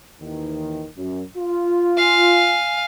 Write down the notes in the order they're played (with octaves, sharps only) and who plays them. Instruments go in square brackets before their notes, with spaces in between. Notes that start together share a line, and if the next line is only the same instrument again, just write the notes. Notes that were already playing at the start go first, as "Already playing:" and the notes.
[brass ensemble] D#2 D#3 E3
F#2
F4
[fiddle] F5 G#5